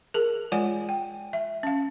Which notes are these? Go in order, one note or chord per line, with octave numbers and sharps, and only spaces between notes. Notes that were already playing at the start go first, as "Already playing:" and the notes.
G#4 A#4
G#3 F4 C#5 D5 F#5 G#5
G5
E5
C#4 F5